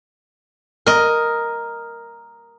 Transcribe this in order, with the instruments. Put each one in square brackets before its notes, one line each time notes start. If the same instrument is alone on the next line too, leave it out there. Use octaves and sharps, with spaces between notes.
[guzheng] A#4 D#5